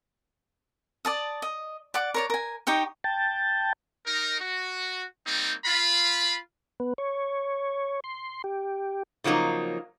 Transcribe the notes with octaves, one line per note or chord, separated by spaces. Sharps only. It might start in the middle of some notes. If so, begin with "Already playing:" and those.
D5 A5 D#6
D#5
D5 F#5 D6
A#4 C#5 D5
A#4 G#5
D#4 G4 G5 C#6
G5 A5
D#4 A#4
F#4
G3 A#3 C4 D#4
F4 B5
B3
C#5
C6
G4
C#3 F3 F#3 A#3 D#4